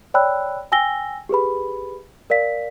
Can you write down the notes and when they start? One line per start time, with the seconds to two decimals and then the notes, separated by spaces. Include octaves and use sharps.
0.14 C#5 D5 G5 B5 E6 F#6
0.72 G5 G#5 E6 A#6 G7
1.29 G4 G#4 B4 B5
2.30 A#4 D5 F5 B6